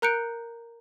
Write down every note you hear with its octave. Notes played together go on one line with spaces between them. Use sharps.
A#4 A#5 F#6 G6 C#7 D7